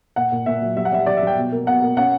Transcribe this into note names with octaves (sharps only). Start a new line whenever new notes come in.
A#2 F#5
A#2
A#2 E5
F#3
G3 E5
F#5
G3 E5
G3 D5
E5
G3 G5
B2
A#3
B2 F#5
A#3
C#4 F#5